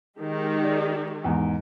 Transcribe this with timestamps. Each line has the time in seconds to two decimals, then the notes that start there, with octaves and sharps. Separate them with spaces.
0.19 D#3 G#3 G4
0.63 D5
1.24 E2 G#2